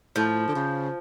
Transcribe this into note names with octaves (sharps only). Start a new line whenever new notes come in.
A2 F3
D3
C#3